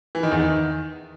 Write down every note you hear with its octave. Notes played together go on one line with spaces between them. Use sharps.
E3
D#3
E2
D#3